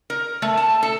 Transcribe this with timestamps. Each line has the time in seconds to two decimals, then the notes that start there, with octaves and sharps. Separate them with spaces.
0.10 A#4
0.42 A3
0.57 A5
0.83 A4